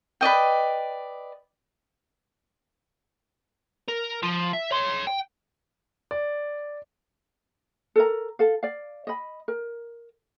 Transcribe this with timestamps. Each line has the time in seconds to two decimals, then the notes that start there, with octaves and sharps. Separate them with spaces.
0.21 B4 D5 D#5 G5
3.88 A#4
4.23 F3
4.53 E5
4.71 C#5 C6
5.07 G5
6.11 D5
7.96 A4 A#4 A#5
8.39 A4 F5
8.63 D5 F5
9.07 D#5 B5
9.48 A#4